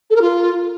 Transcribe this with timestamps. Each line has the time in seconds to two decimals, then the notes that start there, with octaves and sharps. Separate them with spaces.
0.10 A4
0.16 A#4
0.21 F4